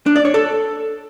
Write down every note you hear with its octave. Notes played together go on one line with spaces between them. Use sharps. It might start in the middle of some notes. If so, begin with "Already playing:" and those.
D4
D5
C#5
A4